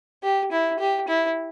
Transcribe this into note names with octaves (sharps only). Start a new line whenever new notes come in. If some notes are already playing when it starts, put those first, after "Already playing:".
G4
E4
G4
E4